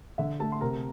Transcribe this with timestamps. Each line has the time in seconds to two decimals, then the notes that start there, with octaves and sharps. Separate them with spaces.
0.18 D3 E5
0.40 A3 A4 A5
0.52 C6
0.61 C3 A#4 A#5